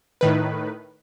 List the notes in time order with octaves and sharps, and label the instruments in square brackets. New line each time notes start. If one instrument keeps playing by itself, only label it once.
[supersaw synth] A2 D#3 B4